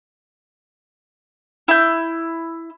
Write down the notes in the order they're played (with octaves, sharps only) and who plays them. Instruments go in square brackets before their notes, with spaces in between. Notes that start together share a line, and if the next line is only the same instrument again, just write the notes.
[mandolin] E4 G6